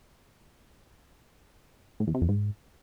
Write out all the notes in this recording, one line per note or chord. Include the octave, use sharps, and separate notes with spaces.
A2
E2
C3
F2
G#2